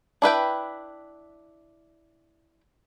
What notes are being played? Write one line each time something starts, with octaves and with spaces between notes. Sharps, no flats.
D4 E4 B4 G5